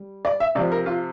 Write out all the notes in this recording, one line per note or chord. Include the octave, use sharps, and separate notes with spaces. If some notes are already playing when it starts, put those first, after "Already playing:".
Already playing: G3
D5
E5
C3 F3 D5
A#4
F4